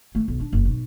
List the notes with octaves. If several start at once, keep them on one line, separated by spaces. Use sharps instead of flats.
A3
B1
D4
F#1
B1